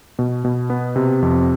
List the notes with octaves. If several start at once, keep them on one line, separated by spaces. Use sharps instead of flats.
B2
B2
B3
C3
F2